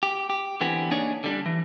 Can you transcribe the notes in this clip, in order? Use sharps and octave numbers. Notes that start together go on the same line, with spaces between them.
G4
G4
D3 E3 B3 C4 G4 G#4
A#3 D4 D#4 G#4 C#5 D5
D3 G3 D4
E3